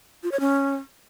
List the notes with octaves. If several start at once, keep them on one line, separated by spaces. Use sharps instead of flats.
F4
C#5
C#4